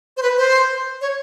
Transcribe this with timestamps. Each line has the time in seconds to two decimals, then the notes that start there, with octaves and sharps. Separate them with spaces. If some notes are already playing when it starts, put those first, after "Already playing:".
0.17 C5
0.22 B4
0.38 C5
1.01 C#5